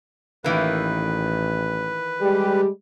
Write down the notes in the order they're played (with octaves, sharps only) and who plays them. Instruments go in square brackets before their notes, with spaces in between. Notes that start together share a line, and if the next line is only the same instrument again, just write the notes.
[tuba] A1 [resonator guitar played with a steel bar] D#3 E3 A#3 [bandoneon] B4
[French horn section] G3 G#3 G4